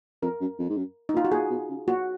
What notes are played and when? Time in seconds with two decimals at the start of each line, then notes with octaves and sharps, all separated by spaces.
0.23 F2 A#4
0.40 F#2
0.59 F2
0.69 G#2
0.77 F#2
1.09 D#4
1.14 A#2
1.17 F4
1.25 F#4
1.32 A#2 G#4
1.50 B2
1.69 C#3
1.87 A#2 F#4